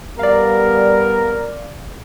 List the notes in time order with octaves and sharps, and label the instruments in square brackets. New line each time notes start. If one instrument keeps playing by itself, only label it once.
[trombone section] G3 B3 [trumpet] A#4 [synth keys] D5 F5